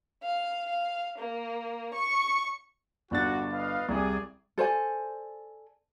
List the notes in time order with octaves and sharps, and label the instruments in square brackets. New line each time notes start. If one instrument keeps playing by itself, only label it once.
[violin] F5
F5
A#3
C#6
[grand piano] G1 D4 A6 [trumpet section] F#4
[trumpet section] B4 D#5 F5
[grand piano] C2 [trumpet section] G#4 D5
[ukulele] A4 C5 D5 G#5